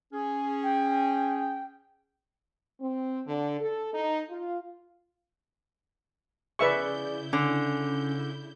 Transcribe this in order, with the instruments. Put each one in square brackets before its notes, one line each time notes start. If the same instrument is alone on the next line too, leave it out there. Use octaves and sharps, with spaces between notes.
[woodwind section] C#4 G#4
[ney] G5
[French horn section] C4
D3
A4
D#4
F4
[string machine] C#3 E4 G6 [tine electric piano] G#4 D5 [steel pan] B4 E5 C#6
[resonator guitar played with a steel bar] D3 [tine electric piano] C#4